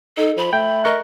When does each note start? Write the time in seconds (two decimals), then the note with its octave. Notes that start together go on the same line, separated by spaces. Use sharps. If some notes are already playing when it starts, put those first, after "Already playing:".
0.17 D#4 A4
0.37 F3 B5
0.53 A3 G5 G6
0.84 A#4 D#5 C#6 F#6